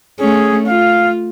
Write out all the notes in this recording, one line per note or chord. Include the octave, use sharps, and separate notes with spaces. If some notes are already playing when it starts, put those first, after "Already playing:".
A3 C#4 G#4
F4 F5